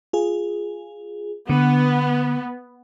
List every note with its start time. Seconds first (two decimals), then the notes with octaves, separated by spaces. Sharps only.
0.13 F4 G#4
1.49 D3 B3